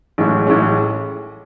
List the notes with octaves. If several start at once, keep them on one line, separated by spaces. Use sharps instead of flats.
A1 A2 G#3 C#4
A1 A2 G#3 C#4